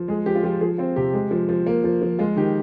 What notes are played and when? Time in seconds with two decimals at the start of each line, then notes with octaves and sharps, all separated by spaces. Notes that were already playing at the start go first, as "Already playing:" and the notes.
Already playing: F3
0.08 G#3 G#4
0.26 F3 G4
0.35 F4
0.43 F3 G4
0.61 F3 G#4
0.78 C4 F4
0.96 C3 G4
1.13 G#3
1.31 F3
1.49 F3
1.66 A#3
1.84 F3
2.02 F3
2.19 G#3 F4
2.37 D#3 G4